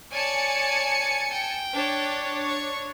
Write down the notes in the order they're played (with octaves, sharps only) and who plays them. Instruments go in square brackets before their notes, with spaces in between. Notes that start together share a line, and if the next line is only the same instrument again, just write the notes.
[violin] C#5 D5 [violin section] G#5 A5 C#7
[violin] G5
[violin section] D4 C#5
[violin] C#6